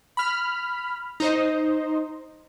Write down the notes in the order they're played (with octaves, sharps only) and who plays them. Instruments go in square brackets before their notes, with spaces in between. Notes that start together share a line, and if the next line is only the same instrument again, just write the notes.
[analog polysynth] B5 F6
D#4 C5 D#5